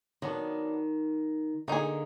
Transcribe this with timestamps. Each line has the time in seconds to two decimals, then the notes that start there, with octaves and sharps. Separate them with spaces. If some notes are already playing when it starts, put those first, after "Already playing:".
0.22 D#3 F#3 B3 D4
1.68 D3 A#3 D#4 G#4